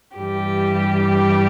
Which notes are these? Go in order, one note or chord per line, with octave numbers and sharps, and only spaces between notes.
G2 E3 G3 G4